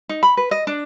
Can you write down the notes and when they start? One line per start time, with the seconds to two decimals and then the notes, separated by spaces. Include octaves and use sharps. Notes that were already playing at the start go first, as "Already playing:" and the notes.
0.09 D#4
0.23 B5
0.37 B4
0.51 D#5
0.67 D4